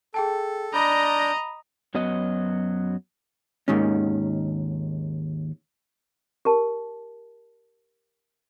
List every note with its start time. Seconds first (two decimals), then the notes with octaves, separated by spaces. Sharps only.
0.14 G#4 A4 G5 A5
0.74 D4 D5 D#5 A#5 B5 G6
1.95 F#2 F#3 B3 F#4 D#5
3.68 D#2 G#2 D#3 C#4
6.45 G4 A#4 A5